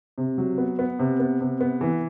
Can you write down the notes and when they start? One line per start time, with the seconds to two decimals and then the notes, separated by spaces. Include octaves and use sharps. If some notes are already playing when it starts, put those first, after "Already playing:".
0.18 C3
0.38 F#3
0.58 B3
0.79 B3
0.99 C3
1.20 B3
1.41 C3
1.61 B3
1.81 E3